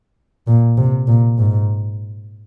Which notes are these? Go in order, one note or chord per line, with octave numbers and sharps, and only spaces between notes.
A#2
C3
A#2
G#2